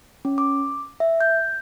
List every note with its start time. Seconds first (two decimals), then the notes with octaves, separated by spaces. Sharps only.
0.25 C#4
0.38 D6
1.00 E5
1.21 G6